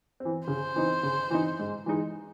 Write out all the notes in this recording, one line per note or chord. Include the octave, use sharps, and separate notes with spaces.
C4
E3
C#3 C5
E3 C4 D#4
C#3
E3 C4 D#4
G#2
E3 G#3 D#4